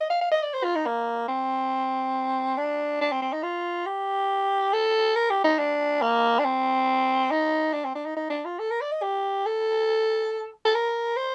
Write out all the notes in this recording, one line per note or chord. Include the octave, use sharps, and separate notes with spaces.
D#5
F5
F5
D#5
D5
C5
F4
D#4
A#3
C4
D4
D4
C4
C4
D#4
F4
G4
A4
A#4
G4
D#4
D4
A#3
D4
C4
D#4
D4
C4
D4
D#4
D#4
D4
F4
A4
A#4
D5
D#5
G4
A4
A4
A#4
C5